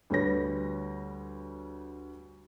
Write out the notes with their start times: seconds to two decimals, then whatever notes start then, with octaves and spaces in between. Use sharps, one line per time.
0.10 D2 G3 B4 C#5 A#6